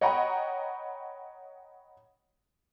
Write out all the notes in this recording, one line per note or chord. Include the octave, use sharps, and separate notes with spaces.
C#5 D#5 F#5 G5 A#5 B5